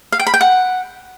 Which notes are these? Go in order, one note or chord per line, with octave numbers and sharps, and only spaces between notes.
F5
G5
B5
G5
F#5